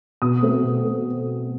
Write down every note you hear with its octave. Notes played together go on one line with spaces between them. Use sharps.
B2 D#6
A3 C4
B2
A3